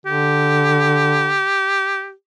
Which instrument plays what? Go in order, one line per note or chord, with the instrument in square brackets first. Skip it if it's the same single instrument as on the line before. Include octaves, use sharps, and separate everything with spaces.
[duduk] D3 [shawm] G4